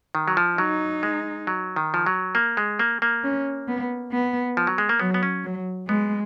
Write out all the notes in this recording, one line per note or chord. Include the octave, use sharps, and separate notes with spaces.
D#3
F#3
F3
F#3 D#4
G#3
F#3
D#3
F3
F#3
A#3
G#3
A#3
A#3
C#4
B3
B3
F3
F#3
G#3
A#3
F#3 B3
B3
C#4
F#3
G#3 B3